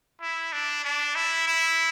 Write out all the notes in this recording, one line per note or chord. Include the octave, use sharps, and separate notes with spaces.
E4
D4
D4
E4
E4